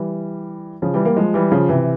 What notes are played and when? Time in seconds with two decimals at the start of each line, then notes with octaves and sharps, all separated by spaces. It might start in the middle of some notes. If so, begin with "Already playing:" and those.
Already playing: E3 G3
0.82 C#3 F3
0.94 E3 G3
1.05 G3 A#3
1.16 F3 G#3
1.34 E3 G3
1.51 C#3 F3
1.69 C3 E3